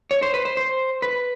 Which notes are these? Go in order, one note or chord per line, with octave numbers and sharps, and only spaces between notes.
C#5
C5
B4
C5
C5
B4